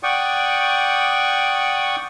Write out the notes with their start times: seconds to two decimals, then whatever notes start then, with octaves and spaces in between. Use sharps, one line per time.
0.03 D5 F#5 G5 C#6 D#6